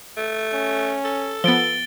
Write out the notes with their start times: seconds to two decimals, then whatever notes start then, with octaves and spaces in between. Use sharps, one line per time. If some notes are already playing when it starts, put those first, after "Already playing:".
0.17 A3
0.53 C#4
1.05 A4
1.44 F3 B3 A6 D7 G7